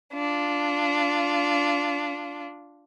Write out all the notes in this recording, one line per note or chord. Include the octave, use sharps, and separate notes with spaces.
D4 F4